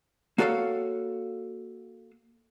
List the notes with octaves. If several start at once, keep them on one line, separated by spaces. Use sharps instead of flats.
A#3 F#4 A4 C#5 F5